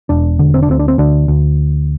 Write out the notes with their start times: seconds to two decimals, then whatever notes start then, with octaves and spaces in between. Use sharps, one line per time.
0.09 E1 D4
0.39 D3
0.54 C4
0.62 D4
0.69 D2 C4
0.79 D4
0.88 C4
0.98 D2 D4
1.28 D2